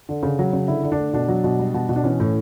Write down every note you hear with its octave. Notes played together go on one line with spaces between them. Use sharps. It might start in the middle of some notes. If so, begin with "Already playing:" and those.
D3
C#3
F#3
C#3
D3 E4
D3
D4
A3
B2 D4
F#3
B2
G3
B2
B2
D4
E3 C#4
A2